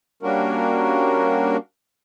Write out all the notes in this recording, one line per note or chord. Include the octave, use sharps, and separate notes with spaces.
G3 A#3 C#4 D4 F#4 A#4